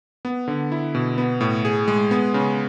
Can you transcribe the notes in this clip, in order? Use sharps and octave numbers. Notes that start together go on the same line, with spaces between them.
B3
D3
E4
B2
B3
A2
G#4
G#3
B3
C#3